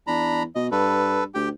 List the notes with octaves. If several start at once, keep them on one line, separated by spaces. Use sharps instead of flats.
E2 D4 A#5 B5
B2 D#5
G2 A4 B4
D2 G4 G5